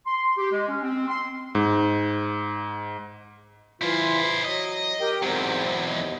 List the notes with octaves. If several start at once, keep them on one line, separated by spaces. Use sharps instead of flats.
C6
G4
G#3
C#4
C4
C6
G#2
E3 E4 F4 C5
F#3 D#5
G4 A#4 G5
E2 G#2 F#3 C4 G5
D#2 D#5